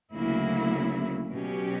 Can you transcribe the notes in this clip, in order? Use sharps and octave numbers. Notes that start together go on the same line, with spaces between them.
D2 C#3 F#3 A#3 E4
B2 F#3 C#4 G4